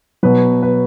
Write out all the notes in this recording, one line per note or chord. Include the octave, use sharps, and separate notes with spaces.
B2 F#3 B4
B4